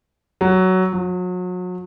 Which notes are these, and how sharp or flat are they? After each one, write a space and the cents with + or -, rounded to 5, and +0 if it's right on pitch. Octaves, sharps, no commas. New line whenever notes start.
F#3 +10
F#3 -35